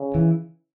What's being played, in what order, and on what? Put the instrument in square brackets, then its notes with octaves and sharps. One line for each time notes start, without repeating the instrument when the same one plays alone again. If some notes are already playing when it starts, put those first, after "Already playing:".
Already playing: [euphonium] C#3
[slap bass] E3